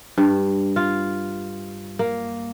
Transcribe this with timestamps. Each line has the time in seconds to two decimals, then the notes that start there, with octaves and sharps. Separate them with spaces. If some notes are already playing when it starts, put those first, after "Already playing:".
0.18 G2
0.76 F4
1.99 A#3